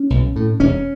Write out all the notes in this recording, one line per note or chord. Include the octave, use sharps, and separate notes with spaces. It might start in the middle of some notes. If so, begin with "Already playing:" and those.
Already playing: C#4
B1
A2
E1 C#4